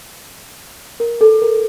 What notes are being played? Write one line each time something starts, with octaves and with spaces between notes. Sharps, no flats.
A#4
A4
A#4